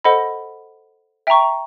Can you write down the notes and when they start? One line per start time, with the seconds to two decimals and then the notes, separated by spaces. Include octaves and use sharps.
0.04 A4 C5 D#5 F#5 B5
1.27 E5 G5 A#5 C#6